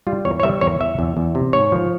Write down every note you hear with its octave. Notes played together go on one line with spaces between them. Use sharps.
G3 F4
E2 C#5
C#5
G3 E5
E2 C#5
E2 E5
E2
E2
C3
G#2 C#5
F3